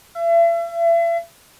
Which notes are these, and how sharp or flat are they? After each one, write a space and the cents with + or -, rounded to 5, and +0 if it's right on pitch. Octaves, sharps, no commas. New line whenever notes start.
E5 +40